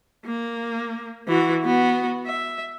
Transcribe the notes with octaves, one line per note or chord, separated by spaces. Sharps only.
A#3
E3 F#4
B3 F#4
E5